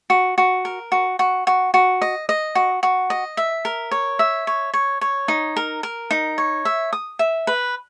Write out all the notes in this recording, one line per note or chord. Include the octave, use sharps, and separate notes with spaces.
F#4
F#4
A#4
F#4
F#4
F#4
F#4
D#5
D#5
F#4
F#4
D#5
E5
A#4
C#5
E5
C#5
C#5
C#5
D#4
A#4
A#4
D#4
C#5
E5
D#6
E5
B4